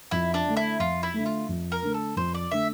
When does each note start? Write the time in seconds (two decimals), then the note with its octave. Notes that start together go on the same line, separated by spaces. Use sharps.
0.11 F2 E4
0.34 D4
0.46 D3 A3
0.57 E4
0.79 F2 F4
1.03 E4
1.14 D3 A3
1.26 F4
1.49 F2
1.72 A#4
1.82 D3 A3
1.94 A4
2.16 F2 C5
2.34 D5
2.51 D3 A3 E5